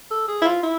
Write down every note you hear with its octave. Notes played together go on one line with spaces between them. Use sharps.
A4
G#4
E4
F4
E4